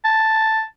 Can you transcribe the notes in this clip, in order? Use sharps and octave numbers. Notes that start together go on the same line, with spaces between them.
A5